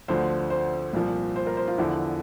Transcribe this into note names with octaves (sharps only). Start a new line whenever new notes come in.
D2 D3 F3 C5
C5
C2 A#2 F3
C5
A#4
C5
F4
E2 D3 F3 E4